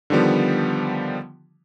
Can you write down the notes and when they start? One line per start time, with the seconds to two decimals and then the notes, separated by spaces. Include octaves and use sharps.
0.10 D3 D#3 F3 G3 B3